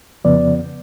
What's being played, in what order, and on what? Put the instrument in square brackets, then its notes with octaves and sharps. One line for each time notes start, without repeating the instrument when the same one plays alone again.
[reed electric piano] F2 C#3 F3 B3 D5